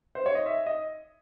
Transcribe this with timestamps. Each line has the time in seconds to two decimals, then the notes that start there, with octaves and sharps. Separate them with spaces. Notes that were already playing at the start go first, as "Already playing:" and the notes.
0.15 C5
0.26 C#5
0.35 D#5
0.46 E5
0.66 D#5